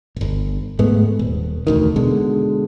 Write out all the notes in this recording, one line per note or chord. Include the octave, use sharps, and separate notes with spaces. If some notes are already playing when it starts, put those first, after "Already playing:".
D1 G1
G#2 G#3 A3 B3
D#1
E1 D2 D#3
B2 D3 G#3